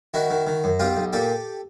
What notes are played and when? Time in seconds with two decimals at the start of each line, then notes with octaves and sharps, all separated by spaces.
0.14 D#3 E4 F#4
0.30 D#3
0.47 D#3
0.64 F#2
0.80 B1 F4 G4
0.97 B1
1.13 A#2 G4 A4